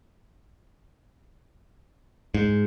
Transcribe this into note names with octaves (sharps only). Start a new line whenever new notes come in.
G#2